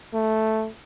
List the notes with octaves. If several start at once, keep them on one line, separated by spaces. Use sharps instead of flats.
A3